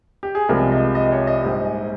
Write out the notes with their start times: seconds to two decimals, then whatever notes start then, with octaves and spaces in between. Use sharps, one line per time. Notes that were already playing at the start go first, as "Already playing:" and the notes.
0.23 G4
0.35 G#4
0.49 C2 C3 F3 G#3 A#4
0.72 D#5
0.95 D#5
1.06 D#5
1.12 C#5
1.27 D#5
1.43 A#1 G#2 G3